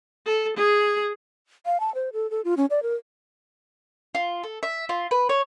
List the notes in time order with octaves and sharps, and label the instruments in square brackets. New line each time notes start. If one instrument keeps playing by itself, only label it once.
[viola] A4
G#4
[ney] F5
A5
C5
A4
A4
F4
C#4
D5
A#4
[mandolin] F4
A4
E5
F4
B4
C#5